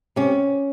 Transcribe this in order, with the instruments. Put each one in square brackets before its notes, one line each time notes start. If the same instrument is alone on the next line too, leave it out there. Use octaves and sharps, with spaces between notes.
[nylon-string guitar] C3 C#4